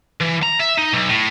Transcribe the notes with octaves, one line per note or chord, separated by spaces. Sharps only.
E3
A#5
E5
D#4
B1
A2